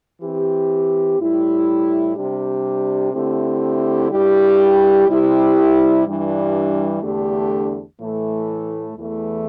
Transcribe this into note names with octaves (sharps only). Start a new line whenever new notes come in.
E3 C4 G4
A2 G3 E4 G4
C3 G3 D4 G4
D3 A3 C4 E4 G4
G2 G3 E4 G4
C3 G3 E4 G4
G2 E3 G3 D4
E2 D3 A3 D4 G4
A2 E3 A3
E2 E3 A3